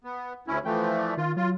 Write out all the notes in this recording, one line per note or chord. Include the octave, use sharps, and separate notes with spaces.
B3
D2 C#4 E4
E3 F3 A3 G5
D5
D#3 F4
F#3 F4